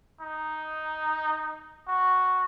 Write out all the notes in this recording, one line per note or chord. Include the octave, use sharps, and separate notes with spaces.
D#4
F#4